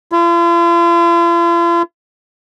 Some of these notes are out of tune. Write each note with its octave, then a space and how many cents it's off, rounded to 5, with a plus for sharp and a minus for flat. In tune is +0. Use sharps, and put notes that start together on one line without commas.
F4 -45